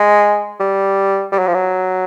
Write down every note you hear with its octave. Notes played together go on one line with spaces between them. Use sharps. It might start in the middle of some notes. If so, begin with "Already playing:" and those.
Already playing: G#3
G3
G3
F#3
F3
F#3